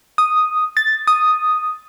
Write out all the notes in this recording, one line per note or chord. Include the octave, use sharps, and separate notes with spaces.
D#6
A6
D#6